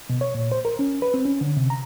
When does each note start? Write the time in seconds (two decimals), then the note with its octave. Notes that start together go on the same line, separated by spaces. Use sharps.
0.10 B2
0.21 C#5
0.35 A#2
0.52 C5
0.65 A#4
0.79 C#4
1.02 B4
1.14 C4
1.25 C#4
1.41 D3
1.57 C3
1.70 A#5